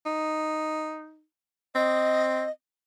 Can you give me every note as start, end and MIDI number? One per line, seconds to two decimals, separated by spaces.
0.06 1.24 63
1.75 2.45 60
1.75 2.50 75